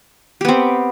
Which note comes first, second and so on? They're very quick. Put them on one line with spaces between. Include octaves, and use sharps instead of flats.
G4 B3 C4